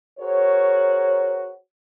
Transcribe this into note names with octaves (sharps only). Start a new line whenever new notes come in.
F#4 G#4 A#4 C5 C#5